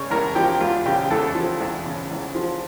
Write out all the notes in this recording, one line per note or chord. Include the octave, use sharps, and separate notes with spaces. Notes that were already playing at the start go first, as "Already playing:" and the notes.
Already playing: C#3 C#5
E2 A#4
F3 G4
E2 F4
C#3 G4
E2 A4
F3
E2
C#3
E2
F3